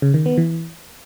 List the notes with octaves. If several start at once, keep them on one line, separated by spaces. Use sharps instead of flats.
C#3
D#3
B3
E3